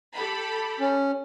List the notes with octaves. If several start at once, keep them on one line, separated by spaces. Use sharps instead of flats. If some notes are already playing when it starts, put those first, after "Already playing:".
G4 A4 B5
C#4